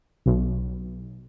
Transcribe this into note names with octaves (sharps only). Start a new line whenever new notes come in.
B1